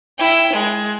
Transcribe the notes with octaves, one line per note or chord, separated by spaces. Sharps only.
E4 G5
G#3